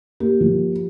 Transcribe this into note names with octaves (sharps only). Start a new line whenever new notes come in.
A#3 G4
F3